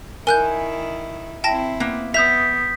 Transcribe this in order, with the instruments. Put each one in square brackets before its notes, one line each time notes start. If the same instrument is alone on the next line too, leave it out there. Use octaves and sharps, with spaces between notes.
[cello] D#3 E4 [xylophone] A#4 F#6 G6 [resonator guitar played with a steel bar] G#5
[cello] C4 E4 [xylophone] G5 A5 A#6
[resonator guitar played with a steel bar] A#3 B3
[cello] B3 [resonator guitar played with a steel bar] E5 [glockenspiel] D#6 G6 B6 [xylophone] F7